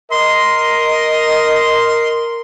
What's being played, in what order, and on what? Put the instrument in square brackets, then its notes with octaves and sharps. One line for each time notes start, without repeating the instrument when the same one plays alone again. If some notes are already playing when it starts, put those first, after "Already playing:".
[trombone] A#4 [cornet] D#5 [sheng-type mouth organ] C6